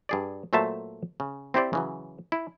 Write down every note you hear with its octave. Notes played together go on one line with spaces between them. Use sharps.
G2 G#4 D5
A#2 F#3 A3 C5 E5 A5
C#3
C4 E4 G4 C5 D5
C#3 E3 F#3
E4